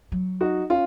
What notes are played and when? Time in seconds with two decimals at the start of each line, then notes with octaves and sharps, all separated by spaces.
0.12 F#3
0.41 D#4 F#4
0.70 C#4 F4